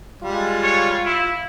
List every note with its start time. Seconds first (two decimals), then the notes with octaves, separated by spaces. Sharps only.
0.23 G3 G#3 F4
0.63 C#5
1.05 E4